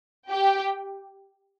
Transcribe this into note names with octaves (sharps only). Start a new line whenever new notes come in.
G4 G5